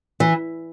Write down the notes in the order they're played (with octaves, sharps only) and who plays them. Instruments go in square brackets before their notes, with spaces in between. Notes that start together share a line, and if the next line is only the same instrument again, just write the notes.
[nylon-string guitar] E3